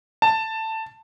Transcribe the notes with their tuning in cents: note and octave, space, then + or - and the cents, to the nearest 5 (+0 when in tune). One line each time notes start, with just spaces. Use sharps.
A5 +10